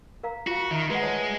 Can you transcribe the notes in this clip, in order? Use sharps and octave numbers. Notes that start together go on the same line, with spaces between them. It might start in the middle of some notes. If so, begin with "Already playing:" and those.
A#4 F5 A#5
F4 F#4 F5
D#3 E5 A#5
G#3 B4 F#5
C5 C#5 A5